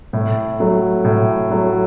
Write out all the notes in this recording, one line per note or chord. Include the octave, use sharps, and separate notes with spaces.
A2
F#3 A3
A2
F#3 A3